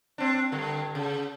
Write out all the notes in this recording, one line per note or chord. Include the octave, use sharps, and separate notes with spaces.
C4 D4
G2 D3
C#3